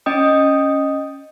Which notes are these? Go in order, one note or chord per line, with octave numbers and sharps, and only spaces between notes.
C#4 D#5 G5 D#6